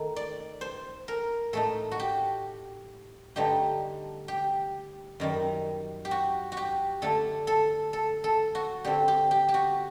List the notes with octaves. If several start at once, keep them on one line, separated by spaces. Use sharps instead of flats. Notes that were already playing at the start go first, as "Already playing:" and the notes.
Already playing: D#3 A3 D#4
D5
C5
A#4
A2 A3 D#4 A4
F#4
G4
G2 D3 A3 D#4 G4
G4
F#2 D#3 G3
G4
F#4
F#4
G4
D3 A3 D4 A4
A4
A4
A4
F#4
D3 G3 C4 G4
G4
G4
G4
F#4